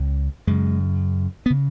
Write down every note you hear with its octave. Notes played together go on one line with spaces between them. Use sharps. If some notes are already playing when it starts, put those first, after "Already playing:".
Already playing: C#2 C#3
F#2 C#3 G#3
B3
C#3